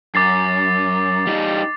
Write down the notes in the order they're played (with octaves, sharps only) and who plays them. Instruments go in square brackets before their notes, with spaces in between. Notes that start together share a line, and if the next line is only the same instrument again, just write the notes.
[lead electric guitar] F#2 [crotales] D6 A6 C7
[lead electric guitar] G3 D#4